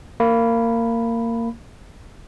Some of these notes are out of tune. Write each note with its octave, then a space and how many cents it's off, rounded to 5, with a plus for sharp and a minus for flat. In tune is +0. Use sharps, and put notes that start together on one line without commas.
A#3 -20 B5 +0